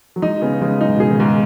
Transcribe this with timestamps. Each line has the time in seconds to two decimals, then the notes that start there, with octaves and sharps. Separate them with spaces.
0.16 F#3
0.22 G#3 D#4
0.42 C#3 B3
0.61 C#3 G#3
0.81 F#3 D#4
0.88 G#2
0.96 B2
1.00 C#3 G#4
1.10 D#3
1.20 G#2